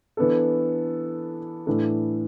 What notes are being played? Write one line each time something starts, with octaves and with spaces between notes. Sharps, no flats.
E3 B3 D4 A4
A2 E3 D4 A4